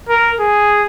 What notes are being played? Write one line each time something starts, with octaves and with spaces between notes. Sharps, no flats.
A#4
G#4